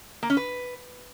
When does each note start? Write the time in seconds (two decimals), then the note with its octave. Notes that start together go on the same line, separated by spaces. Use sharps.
0.23 A#3
0.30 C#4
0.37 B4